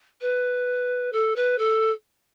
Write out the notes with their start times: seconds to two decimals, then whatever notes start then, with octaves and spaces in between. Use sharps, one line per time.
0.21 B4
1.12 A4
1.36 B4
1.58 A4